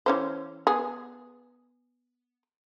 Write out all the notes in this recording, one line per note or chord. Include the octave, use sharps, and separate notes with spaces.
E3 C#4 C5
B3 G#4